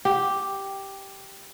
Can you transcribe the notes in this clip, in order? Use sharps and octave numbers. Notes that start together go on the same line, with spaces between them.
G4